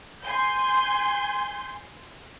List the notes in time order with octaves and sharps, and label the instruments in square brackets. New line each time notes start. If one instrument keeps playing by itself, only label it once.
[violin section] G#5 C6 G6